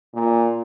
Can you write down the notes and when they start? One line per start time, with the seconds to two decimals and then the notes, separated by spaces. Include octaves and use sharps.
0.14 A#2